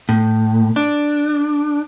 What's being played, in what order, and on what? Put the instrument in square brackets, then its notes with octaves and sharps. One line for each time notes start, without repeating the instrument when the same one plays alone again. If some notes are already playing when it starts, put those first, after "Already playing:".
[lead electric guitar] A2
D4